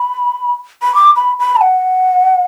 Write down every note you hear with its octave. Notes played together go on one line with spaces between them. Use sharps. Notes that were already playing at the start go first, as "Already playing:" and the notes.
Already playing: B5
B5
D6
B5
B5
A5
F#5